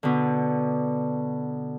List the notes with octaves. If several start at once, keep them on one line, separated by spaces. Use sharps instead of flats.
B2 D3